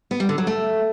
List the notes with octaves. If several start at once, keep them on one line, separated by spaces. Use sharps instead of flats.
B3
G3
D3
F#3
A3